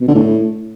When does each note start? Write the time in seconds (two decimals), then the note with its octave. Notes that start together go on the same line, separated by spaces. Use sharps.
0.01 B2
0.08 D3
0.15 A2